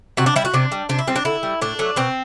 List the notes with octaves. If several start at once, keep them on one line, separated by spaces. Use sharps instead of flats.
C3 F#4
D4
G3 E4
F#4
C3 D4
G3
C3 D4
E4
G3 C4
D4
D3 E4
G3
A2 D4
F#3 A3
B2 C4